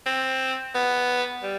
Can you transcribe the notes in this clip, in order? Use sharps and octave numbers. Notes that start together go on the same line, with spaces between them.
C4
B3
G3